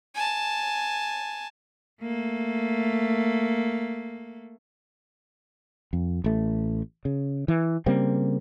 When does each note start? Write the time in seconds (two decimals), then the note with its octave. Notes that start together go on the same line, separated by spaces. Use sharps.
0.14 G#5 A5
2.02 A3 A#3
5.93 F2
6.24 A1 A3
7.05 C#3
7.48 E3
7.86 C#3 G3 A#3 C4